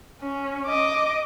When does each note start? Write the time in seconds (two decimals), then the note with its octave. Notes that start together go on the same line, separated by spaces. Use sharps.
0.22 C#4
0.66 D#5 D6